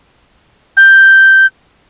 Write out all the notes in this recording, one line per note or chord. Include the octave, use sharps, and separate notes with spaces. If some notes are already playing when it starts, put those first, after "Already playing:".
G6